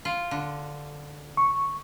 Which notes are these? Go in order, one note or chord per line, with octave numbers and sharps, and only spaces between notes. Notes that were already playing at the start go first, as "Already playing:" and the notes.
F4
D3
C#6